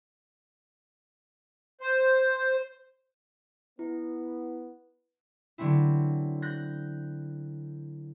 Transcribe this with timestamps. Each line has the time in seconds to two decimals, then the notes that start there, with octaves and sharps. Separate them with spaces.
1.81 C5
3.79 B3 E4
5.58 D3 F#3 B3 C4 E4
6.42 F#6 G6 A#6